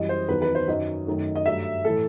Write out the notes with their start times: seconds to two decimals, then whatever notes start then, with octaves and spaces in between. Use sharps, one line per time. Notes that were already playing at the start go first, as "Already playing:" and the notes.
Already playing: F#2 E3 G3 D#5
0.09 C5
0.29 E2 D#3 F#3 B4
0.42 B4
0.55 C5
0.68 F#2 D#3 F#3 D#5
1.07 F#2 D#3 A3
1.35 D#5
1.46 G2 F#3 A3 E5
1.85 A2 E3 A3 A4